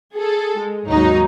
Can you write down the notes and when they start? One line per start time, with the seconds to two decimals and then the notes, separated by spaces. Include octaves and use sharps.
0.16 G#4 A4
0.58 G#3
0.88 D#2 G#2 F#3 D#4